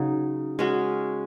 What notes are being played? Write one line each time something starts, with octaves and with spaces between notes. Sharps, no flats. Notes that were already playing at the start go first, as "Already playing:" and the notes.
Already playing: C#3 F#3 D#4
G#3 C#4 F#4